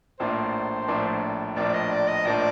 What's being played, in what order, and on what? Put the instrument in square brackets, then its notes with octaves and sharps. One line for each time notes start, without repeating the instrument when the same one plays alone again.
[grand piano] A#1 A2 F3 A#3 D4 [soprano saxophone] C5
[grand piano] A#1 A2 F3 A#3 D4
[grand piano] A#1 A2 F3 A#3 D4 [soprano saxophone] D5
[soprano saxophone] D5
D#5
D5
D#5
[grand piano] A#1 A2 F3 A#3 D4 [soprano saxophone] D5